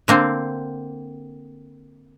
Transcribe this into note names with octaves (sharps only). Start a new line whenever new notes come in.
D3 A#3 C4